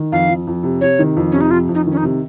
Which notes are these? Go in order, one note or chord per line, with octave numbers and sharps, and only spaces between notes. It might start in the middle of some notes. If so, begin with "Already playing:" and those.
Already playing: D#3
F2 F5
F2
F2
C3
C3 C#5
D#3
F2
C3 C#4
D#4
F2 F4
F2
D#4
D#3
C#4
D#4
C3